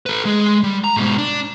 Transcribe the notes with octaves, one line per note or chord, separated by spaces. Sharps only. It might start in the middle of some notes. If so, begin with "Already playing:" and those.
A4 B4
G#3 G#4
G3
A#5
G#2 B2
D4